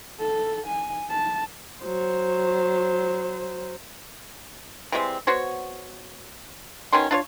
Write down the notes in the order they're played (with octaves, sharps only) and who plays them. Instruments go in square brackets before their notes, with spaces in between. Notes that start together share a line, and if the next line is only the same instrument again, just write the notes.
[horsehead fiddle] A4
G#5
A5
[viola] F#3 C5
[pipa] E3 G3 G#3 C4
B3 F#4 C5 C#5
B2 D#3 C#4 C6
D4 F4 C#5